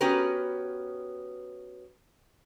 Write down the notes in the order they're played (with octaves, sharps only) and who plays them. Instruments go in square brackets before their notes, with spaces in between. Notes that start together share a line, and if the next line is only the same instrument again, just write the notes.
[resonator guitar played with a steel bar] B3 C#4 F#4 G4 A#4 B4